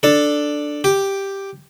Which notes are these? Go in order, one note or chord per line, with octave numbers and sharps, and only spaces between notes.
D4 A4
G4